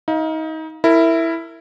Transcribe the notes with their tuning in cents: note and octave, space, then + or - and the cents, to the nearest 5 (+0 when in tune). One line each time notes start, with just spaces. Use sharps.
D#4 +30 F5 +0
E4 +0 A#4 -30